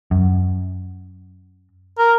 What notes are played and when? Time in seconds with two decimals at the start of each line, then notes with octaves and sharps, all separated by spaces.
0.11 F#2
1.98 A#4